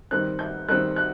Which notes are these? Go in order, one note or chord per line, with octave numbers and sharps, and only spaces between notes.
D#3 G3 C4 F#6
G6
D#3 G3 C4 F#6
F#6